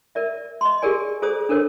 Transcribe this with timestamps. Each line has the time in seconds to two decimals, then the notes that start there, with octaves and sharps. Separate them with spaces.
0.15 A#4 D5 E5
0.61 D#5 C6
0.82 G4 G#4 A#4 D5 G#5
1.22 F4 G#4 A4 C5 D5 D#6
1.49 D4 A4 A#4 C5 C#5